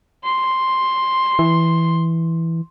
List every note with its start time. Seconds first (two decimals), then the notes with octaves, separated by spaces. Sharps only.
0.25 C6
1.39 E3